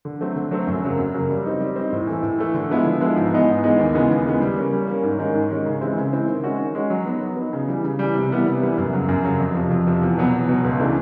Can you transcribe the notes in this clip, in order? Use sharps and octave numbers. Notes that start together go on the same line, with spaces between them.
D3
F#3 A3 C4
D3
F#3 A3 C4
F#2
C#3 F#3 A#3
F#2
C#3 F#3 A#3
G3
C4 D#4
G3
C4 D#4
A2
E3 A3
A2
E3 A3
D3
F3 G#3 B3 E4
D3
F3 G#3 B3 E4
G#2
E3 G#3 B3 D#4
G#2
E3 G#3 B3 D#4
D#2
C#3 E3 G#3 B3
D#2
C#3 E3 G#3 B3
G3
A#3 C#4
G3
A#3 C#4
G#2
D#3 G#3 C#4
G#2
D#3 G#3 C#4
C#3
E3 G#3 C4 E4
C#3
E3 G#3 C4 E4
D#3
G#3 C#4 F#4
D#3
G#3 C#4 F#4
F#3
B3 D#4
F#3
B3 D#4
C#3
E3 G3
C#3
E3 G3
C3
E3 G3 B3 E4
C3
E3 G3 B3 E4
F#2
C#3 F#3
F#2
C#3 F#3
F2
C3 F3
F2
C3 F3
E2
B2 F#3 B3
E2
B2 F#3 B3
C#2
C#3 E3 A3 D4